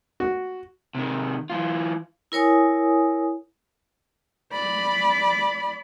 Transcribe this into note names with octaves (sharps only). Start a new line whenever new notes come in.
F#4
C3 D#3
E3 F4
E4 A#4 C#5 G#5 D#6
D5 B5